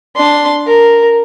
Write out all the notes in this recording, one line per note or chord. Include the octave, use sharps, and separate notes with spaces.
D4 C6
A#4